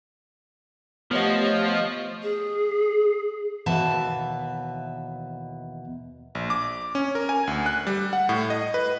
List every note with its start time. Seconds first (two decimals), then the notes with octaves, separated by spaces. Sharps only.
1.11 F3 A3 B3 G4 C#5 D#5
2.23 G#4
3.66 D#2 B2 E3 B4 E5 A5
6.35 A#1
6.50 D6
6.95 C#4
7.15 A#4
7.29 G#5
7.47 D2
7.66 F#6
7.87 G3
8.13 F#5
8.29 A2
8.50 D#5
8.74 B4